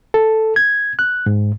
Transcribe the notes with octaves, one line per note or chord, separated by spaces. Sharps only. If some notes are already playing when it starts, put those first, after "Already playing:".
A4
G#6
F#6
G#2